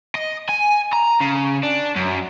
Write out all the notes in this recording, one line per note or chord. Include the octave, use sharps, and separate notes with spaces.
D#5
G#5
A#5
C#3
D4
F#2